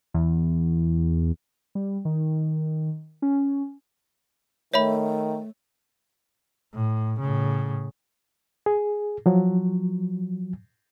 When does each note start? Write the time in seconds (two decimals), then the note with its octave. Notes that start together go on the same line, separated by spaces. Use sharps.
0.14 E2
1.75 G3
2.05 D#3
3.22 C#4
4.74 D#3 A3 C#5 E5 B5
6.74 A2
7.20 A2 C#3
8.66 G#4
9.26 F3 F#3